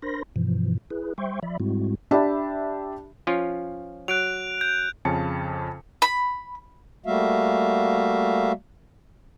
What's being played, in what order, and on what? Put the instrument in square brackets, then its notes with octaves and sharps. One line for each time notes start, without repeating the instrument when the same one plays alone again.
[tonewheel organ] D4 A#4 C5 B5 C6 A#6
G2 B2 E3 F3
E4 G#4 B4
G3 C5 E5 G5 C6 C#6
F3 D5 E5 B5
G#2 G3 G#3 C4 E4 F#4
[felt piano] D4 G4 E5 A5 B5
[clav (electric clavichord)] F3 C#4 F4
[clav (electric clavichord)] F#3 [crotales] F#6 D7 F7
[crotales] G6
[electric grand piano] F2 C#3 C#4 A5 C#7
[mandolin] B5
[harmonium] G3 A3 A#3 F#4 E5 F5